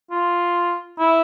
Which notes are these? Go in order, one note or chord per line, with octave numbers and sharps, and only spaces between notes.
F4
E4